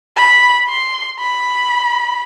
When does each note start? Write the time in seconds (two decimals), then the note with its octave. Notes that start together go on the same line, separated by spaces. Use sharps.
0.16 B5
0.69 C6
1.20 B5